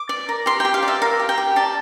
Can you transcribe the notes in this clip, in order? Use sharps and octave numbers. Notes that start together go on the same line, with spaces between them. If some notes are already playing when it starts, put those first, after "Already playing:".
Already playing: D6
D5
A#4
G4 C6
G5
G4
F5
D5
E5
A#4 F5
G4
G5
G4
D5 A5